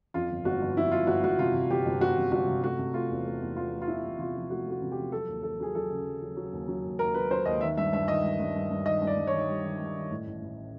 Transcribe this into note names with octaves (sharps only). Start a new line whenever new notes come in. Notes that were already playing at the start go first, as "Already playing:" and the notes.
F2 F4
G1
G1 F#4
G1
F2 E4
G1 F4
G1 F#4
G1 F#4
C3 F4
C3
G1 G4
G1
G1 F#4
C3
G1 F#4
C3
A3 F#4
C3
A3 F4
E2
A3
E2
E2 F4
A3
F4
E2 E4
E2
C3 F4
F3
A3 F#4
A3 F#4
C3
G4
F3
F#3 A4
D#2
D#2 A4
F#3 G#4
F#3 A4
C#3
F#3
F#3
F#3
D#2
F#3
D#2
D#2 A#4
F#3 B4
F#3 C5
D#2 D#5
D#3 E5
G2 E5
G2 E5
D#3 D#5
G2
G2
G2
G2
D#3 D#5
G2
D5
G2
D#3 C#5
G3
D#3
G3
D#3
A2
A1
A1